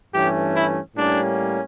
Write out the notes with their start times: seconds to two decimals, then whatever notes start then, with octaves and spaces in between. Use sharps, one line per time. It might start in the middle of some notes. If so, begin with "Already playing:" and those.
0.14 G2 E3 A3 C#4 G4
0.55 E4
0.95 A2 G3 A#3 C#4 D4